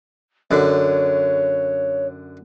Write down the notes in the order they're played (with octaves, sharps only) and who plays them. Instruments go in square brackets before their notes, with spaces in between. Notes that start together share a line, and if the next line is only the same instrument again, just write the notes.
[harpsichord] F#2 D3 [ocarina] C#5